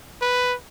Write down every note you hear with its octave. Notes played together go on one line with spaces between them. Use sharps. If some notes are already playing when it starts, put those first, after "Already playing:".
B4